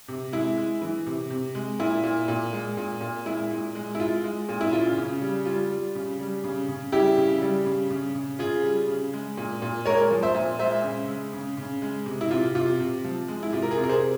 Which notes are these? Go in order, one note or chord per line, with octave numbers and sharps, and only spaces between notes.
C3
G#3 E4
G#3
E3
C3
C3
G#3
A#2 E4
A#2
A#2
G#3
A#2
A#2
G#3 E4
A#2
G#3
E4
G#3 F4
G#3
A#2
E4
C#3 F4
C#3
G3
G3 F4
G3
C#3
G3
C#3
C#3
G3 E4 G4
C#3
G3
C#3
C#3
C#3
C#3 F4 G#4
G3
C#3
G#3
A#2
A#2
G#3 A#4 C#5
F3
C5 E5
A#2
G#3 C5 E5
C#3
G#3
C#3
C#3
G#3
C3
E4
C3 F4
C3 F4
C3
F3
G#3
E4
C3 F4
A#4
F4 G#4
C3
A#4
G#4 C5